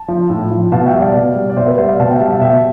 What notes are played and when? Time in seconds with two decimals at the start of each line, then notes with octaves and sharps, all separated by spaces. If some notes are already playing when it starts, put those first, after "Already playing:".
Already playing: A5
0.08 F3
0.30 A2
0.51 F3
0.72 B2 F5 A5
0.86 E5 G5
0.94 G3
1.00 D5 F5
1.14 B2
1.36 G3
1.50 D5
1.57 B2 C5 E5
1.67 B4 D5
1.78 G3 C5 E5
1.88 D5 F5
1.99 B2 F5 A5
2.10 E5 G5
2.20 G3 F5 A5
2.31 E5 G5
2.41 B2 E5 G5